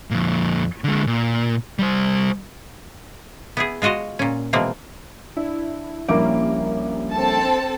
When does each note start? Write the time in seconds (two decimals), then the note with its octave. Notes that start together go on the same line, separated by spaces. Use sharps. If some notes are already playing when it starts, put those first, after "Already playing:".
0.11 F2 A#2
0.84 D3 G#3
1.07 A#2
1.79 G3 C5
3.57 B3 E4 G#4
3.82 G#3 F4 F#4 D#5 F5
4.19 A#2 C#4
4.53 B2 E3 F3 G#3 A#3 C4
5.37 D4 E4
6.09 A#1 G3 A#3 C#4 E4 D6 D7
7.12 C4 A4 A5